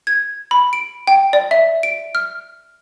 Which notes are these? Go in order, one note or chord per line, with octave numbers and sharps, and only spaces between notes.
G#6
B5
D7
G5
D5
E5
D7
F6